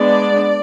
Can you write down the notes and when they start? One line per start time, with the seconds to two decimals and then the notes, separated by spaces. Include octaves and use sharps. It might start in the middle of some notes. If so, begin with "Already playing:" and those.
Already playing: G#3 B3 D4 D5